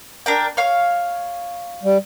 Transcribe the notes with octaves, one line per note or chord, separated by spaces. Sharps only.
D4 A#4 G5
C#5 F5
G3